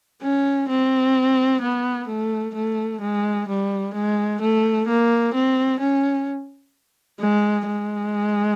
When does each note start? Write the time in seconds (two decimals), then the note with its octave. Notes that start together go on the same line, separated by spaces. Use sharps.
0.22 C#4
0.69 C4
1.62 B3
2.08 A3
2.55 A3
3.01 G#3
3.48 G3
3.94 G#3
4.41 A3
4.87 A#3
5.34 C4
5.80 C#4
7.20 G#3
7.67 G#3